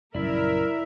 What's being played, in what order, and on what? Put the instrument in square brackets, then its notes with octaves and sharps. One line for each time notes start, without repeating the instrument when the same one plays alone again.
[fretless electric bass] A#1 C#3 [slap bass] F#2 G3 [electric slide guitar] E4 D5 [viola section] A#4 E5